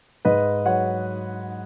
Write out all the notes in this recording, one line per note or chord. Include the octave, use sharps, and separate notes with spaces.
G#2 B4 D#5
F#3 C#5 F#5